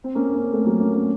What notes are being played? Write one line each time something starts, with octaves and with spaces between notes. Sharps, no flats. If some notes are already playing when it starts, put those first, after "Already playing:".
C4
A#3 C#4
A#3 C#4
A3 C4
F#3 A#3
A#3 C#4
A#3 C#4